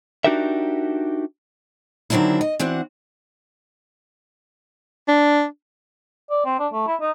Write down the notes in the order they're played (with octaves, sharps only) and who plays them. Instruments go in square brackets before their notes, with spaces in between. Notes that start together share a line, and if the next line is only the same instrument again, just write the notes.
[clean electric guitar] D4 D#4 F#4 G4 A#4 E5
[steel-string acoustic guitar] D3 D#3 F#3 C4 D4 E4
D#5
E3 C4 D4 F#4 F#5
[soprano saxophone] D4
[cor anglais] D5
C4
D4
A3
E4
D#4